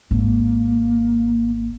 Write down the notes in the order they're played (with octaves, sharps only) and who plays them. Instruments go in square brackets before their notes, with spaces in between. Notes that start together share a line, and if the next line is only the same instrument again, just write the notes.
[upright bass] G#1 [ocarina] A#3